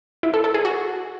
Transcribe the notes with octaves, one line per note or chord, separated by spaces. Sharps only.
E4
A4
A4
G#4
F#4